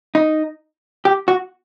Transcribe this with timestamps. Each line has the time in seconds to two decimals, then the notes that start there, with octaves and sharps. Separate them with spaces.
0.15 D#4
1.05 G4
1.28 F#4